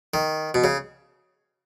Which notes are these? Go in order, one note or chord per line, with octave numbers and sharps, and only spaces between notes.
D#3
B2
C#3